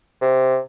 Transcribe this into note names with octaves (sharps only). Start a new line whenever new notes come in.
C3